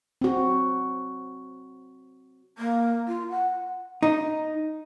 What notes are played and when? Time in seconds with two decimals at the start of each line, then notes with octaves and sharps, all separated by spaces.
0.21 C4 F#4
2.58 A#3
3.08 F4
3.30 F#5
4.03 D#4